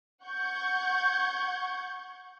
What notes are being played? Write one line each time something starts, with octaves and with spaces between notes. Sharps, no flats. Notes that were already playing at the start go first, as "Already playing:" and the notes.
F#5 C#6 G6 G#6